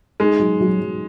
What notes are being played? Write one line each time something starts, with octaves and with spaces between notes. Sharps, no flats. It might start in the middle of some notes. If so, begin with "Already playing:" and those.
G#3 D#4
F#3
F#3
F#3